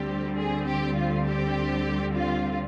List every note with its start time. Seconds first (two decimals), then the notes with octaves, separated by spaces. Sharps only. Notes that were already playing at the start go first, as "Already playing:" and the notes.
Already playing: D2 D3 G3 C4 G4
0.37 G#4
0.66 G4
0.96 F4
1.26 G4
2.14 F4